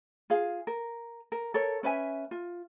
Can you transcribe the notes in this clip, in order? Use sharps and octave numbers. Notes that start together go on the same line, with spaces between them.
F4 G#4 F5
A#4
A#4
A4 A#4 C#5
C#4 B4 E5 G#5
F4